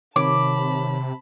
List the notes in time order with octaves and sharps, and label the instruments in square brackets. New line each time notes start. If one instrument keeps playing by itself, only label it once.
[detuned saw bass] C3 [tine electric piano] D#3 C#5 [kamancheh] A5 B5 [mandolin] D6